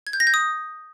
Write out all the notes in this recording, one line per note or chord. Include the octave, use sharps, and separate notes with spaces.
G#6
G6
A#6
G6
D#6